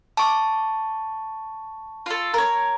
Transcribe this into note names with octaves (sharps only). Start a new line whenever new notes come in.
A5 C#6 D6
F4 A4
A#4 C#5